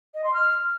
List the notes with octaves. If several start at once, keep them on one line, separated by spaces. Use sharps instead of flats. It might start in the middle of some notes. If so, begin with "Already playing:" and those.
D#5
C6
F6